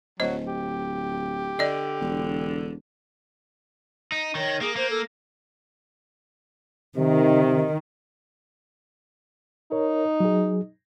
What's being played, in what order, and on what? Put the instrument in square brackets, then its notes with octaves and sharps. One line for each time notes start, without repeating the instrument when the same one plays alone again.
[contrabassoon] D1 [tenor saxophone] F#3 [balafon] C5 D#5
[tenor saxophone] G4
[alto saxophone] D3 [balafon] D5 D#5
[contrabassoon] E1
[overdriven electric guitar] D#4
[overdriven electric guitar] D#3 [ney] C#5
[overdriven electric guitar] A#3 [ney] G#4
[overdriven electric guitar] A#3 [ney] C5
[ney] A4
[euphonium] C3 [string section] D#3
[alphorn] D#4 [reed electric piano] A#4 C#5
[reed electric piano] F#3 G#4